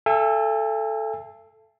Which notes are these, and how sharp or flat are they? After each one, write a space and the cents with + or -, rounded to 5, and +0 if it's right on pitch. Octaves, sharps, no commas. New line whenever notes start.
A4 +0 E5 +40 G#5 -40